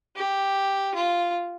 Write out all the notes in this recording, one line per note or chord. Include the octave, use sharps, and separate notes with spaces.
G4
F4